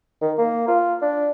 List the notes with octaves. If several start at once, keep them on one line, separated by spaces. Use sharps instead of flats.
D#3
A#3
F4
D4